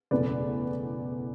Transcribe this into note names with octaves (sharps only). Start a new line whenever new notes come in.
F#1 E2 B2 A3 B4 D5